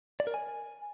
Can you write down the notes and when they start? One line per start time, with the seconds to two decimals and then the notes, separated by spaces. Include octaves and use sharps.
0.20 D5
0.27 A#4
0.34 G#5